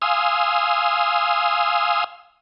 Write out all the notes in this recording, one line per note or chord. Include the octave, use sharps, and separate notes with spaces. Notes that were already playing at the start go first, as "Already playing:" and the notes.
F5 G#5 C6 D#6 E6